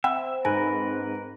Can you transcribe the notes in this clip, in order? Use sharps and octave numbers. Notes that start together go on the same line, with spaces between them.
C4 E5 F#5 G5 B5
G#2 A#4 B4 G#5